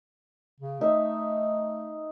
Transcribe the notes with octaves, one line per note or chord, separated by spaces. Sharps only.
C#3
A3 D#4 E5